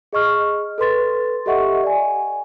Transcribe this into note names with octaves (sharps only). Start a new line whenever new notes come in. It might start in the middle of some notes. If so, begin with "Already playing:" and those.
G#4 D#5 C#6 F6
A4 B4 C6 A6
G4 A4 D#5 E5 F#5 C#6
D5 G#5